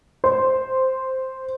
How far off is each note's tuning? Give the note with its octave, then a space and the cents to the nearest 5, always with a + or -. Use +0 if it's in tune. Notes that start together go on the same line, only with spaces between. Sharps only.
C5 -5